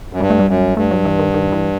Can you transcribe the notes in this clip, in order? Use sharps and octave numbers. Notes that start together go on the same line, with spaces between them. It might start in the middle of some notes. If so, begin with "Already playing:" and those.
F#2
G2 G3
A3
G3
F#2
G2 A3
F#3
E3
D#3
D#3
E3